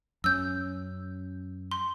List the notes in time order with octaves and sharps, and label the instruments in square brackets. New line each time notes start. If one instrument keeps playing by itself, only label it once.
[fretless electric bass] F#2 C#4 [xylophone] E6 G6
[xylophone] C6